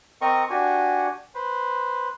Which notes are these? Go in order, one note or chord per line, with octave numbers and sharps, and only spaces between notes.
C4 A#4 D#5 C#6
D4 F#4 G4 G#5
B4 C5